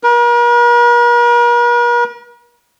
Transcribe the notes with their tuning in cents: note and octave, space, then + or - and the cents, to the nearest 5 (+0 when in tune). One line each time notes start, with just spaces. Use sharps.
A#4 +45